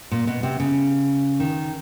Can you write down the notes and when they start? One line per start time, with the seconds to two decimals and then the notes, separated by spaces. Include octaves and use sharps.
0.12 A#2
0.27 B2
0.43 C3
0.60 C#3
1.40 D#3